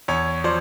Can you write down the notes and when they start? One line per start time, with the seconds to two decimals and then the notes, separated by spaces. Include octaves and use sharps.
0.08 E2 C#5
0.44 F3 C5 D5